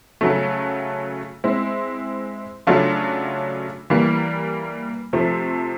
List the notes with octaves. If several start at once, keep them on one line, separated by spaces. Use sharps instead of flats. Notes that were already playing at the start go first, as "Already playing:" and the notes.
C#3 F#3 A3
G#3 C4 E4
C#3 F#3 A3 D4 F4
E3 G3 A#3
C3 F3 A3